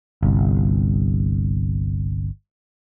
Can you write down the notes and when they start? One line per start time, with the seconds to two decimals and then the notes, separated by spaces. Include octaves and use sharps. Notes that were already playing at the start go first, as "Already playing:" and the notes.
0.23 G1 C2